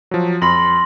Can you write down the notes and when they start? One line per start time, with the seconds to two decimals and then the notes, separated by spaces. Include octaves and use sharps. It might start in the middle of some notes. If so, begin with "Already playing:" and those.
0.11 F3 F#3
0.42 F2 B5 C6 A#6 F#7